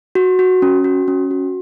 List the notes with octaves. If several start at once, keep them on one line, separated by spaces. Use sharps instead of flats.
F#4
F#4
C#4
F#4
C#4
F#4